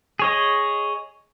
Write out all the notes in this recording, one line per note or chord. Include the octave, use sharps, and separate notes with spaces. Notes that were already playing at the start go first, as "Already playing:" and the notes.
G#4 C#5 D#5